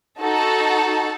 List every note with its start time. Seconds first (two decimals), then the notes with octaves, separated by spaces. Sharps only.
0.20 D#4 F#4 A4 A5